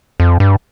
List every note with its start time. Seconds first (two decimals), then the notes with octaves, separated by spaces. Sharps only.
0.20 F2
0.40 G2